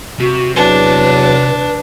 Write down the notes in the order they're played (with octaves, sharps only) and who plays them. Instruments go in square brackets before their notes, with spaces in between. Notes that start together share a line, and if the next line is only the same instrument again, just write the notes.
[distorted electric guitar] C3 [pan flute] F#4
[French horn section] E2 F#3 [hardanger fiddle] D4 [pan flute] B4